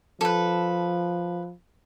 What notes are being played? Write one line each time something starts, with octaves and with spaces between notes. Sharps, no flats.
F3 A4 B4